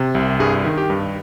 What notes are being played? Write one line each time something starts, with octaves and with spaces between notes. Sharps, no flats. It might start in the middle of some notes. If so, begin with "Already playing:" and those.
Already playing: C3
C2
G2 G#4
D#3
G4
G2